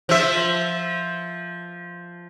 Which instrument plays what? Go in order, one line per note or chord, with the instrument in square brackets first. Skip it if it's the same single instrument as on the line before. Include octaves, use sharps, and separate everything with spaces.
[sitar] F3 E5